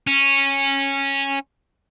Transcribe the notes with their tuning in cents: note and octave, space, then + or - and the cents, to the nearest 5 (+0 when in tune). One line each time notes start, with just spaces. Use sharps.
C#4 -10